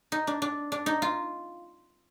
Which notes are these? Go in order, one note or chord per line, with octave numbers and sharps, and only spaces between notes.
D#4
D4
D4
D4
D#4
F4